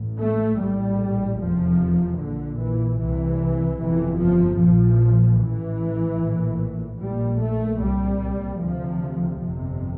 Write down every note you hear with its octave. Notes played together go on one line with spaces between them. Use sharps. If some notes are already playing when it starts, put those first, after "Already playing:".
Already playing: A1 A2
A3
A#1 A2 G3
F1 E2 C3 F3
A#1 A#2 D3
E3
C2 C3 E3
G1 F2 C3 E3
F3
A#1 A#2 F3
A1 A2 E3
A#1 A2
A#1 A#2 G3
A3
C2 A#2 G3
D2 C3 F3
G1 F2 C3